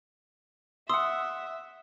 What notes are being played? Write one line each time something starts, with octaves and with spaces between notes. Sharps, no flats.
E5 F#5 C6 D#6 E6